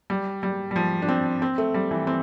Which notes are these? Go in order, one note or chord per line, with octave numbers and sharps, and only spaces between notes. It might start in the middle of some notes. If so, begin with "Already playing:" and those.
G3
G3
G3
F3
D4
C4
C4
A3
G3
E3
C4